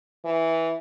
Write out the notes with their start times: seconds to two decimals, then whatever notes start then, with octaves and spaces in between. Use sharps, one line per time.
0.25 E3